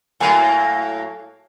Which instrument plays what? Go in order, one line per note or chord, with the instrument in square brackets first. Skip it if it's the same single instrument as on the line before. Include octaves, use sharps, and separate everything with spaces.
[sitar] A2 F#3 A#3 [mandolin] A4 G#5 A5